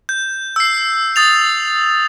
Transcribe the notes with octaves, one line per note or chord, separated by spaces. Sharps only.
G6
E6 C7
D#6 A6 F7